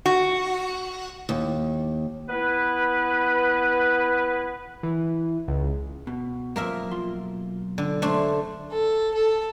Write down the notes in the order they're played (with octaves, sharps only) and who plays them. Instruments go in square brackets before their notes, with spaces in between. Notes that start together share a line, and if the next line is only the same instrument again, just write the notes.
[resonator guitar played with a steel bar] F#4
[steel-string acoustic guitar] D#2
[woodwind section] B3 E4 B4
[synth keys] E3
C#2
[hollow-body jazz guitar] B2
[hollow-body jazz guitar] F#2 F3 [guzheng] A#3 A#4 E5
[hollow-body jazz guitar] B1 F4 C6
[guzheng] D3
A3 D4 C5
[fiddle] A4
A4